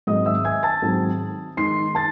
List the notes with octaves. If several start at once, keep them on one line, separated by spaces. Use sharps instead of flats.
G#2 D#3 F#3 C4 D#5 D#6
E5 E6
G#5 G#6
A5 A6
G#2 D#3 F#3 C4
D#3 G#3 D#4 C6 C7
A5 A6